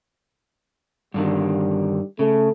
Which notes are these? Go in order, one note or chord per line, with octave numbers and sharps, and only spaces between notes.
G2 D3 D#3 G3
C#3 A3